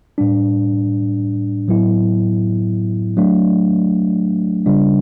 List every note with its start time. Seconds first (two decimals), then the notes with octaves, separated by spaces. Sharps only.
0.18 A2 G3 D4
1.68 A2 F#3 B3 E4
3.17 F#3 A3 D4
4.66 C#3 G3 D4